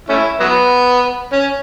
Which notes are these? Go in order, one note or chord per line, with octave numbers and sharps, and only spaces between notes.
A3 C#4 E4
F#3 B3
C#4